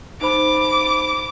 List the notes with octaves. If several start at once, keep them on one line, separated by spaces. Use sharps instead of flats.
D#4 C5 B5 D6